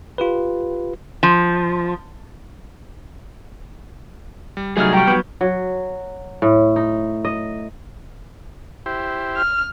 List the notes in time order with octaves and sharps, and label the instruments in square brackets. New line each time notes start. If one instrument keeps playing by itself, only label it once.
[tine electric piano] F4 G4 B4
[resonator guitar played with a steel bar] F3
[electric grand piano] G3
[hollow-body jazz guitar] C2 F#3 A3 [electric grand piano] G3 D#4 F6 [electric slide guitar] G#4
[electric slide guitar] G3 [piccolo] G5 [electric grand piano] A#5 C#6
[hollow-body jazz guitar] F#3 B3 [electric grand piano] C#6 G6
[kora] F#3
A2
D#4
D#5
[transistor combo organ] E4 G4 C5
[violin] F6